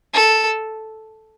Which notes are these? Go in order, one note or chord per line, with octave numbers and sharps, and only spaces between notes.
A4